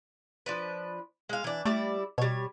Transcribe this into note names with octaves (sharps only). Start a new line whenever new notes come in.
F3 D4 B4
G#3 F5
E3 D4
G3 A3 E4 D5
B2 G3 C#5